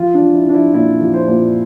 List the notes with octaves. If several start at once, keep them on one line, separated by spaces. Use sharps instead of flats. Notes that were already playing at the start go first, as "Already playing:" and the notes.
Already playing: F3 F4
D4
F3
E4
F3 D4
E4
A#2 E4
F3
C5
A#2